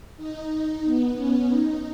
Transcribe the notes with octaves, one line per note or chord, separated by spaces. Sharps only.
D#4
B3
C#4
D#4